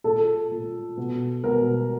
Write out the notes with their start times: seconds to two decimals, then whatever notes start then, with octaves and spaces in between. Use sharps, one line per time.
0.04 A#2 A4
0.51 A#2
0.97 B2
1.44 B2 A#4